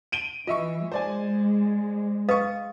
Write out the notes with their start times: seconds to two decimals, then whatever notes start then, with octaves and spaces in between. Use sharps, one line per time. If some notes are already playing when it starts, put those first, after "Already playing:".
0.12 D7 D#7 G7
0.47 E3 F4 D#5 E5 C#6
0.92 G#3 C5 D5 G#5
2.29 B4 D#5 F5 C#6 D#6